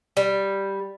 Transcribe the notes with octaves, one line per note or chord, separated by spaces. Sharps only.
G3